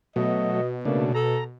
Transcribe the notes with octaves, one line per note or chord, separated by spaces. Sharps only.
B2 F#3 A3 D#5
C#3 A3 A#3 D4
A4 A#5